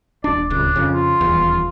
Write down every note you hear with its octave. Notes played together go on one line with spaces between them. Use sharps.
D#1 D4 D5
D1 C#2 D4
F2 C#3
F4
D#1 E2